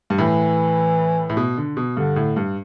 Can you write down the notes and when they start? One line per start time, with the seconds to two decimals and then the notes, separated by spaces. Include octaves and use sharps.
0.10 G2
0.18 A2 E3
1.30 A2
1.37 B2
1.58 D3
1.77 B2
1.97 G2 D3
2.16 A2
2.36 G2